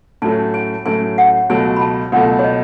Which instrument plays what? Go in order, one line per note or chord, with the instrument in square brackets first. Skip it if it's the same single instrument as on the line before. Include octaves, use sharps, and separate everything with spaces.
[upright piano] A2 F#3 A3 C#4 [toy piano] A5
[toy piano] G#5
[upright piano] A2 F#3 A3 C#4 [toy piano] G#5
[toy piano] F#5
[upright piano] C#2 B2 F#3 A3 [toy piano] G#5
[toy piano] B5
A5
[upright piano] C#2 B2 F#3 A3 [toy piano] F#5
[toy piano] C#5
D#5